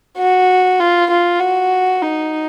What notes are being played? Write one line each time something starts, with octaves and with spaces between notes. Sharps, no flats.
F#4
F4
F4
F#4
D#4